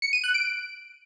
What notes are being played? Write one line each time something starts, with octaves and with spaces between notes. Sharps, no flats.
C#7
D#7
F#6
D7